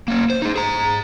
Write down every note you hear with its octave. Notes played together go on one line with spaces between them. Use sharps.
A#3 C#4
C5
D#4 G#4
G#4 A#5